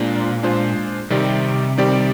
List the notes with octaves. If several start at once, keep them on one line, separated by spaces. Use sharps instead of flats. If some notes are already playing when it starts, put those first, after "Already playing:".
Already playing: A#2 G#3 D4 F4 C5
G#3 D4 F4 C5
C3 D#3 G3 C4 G4 D5
D#3 G3 C4 G4 D5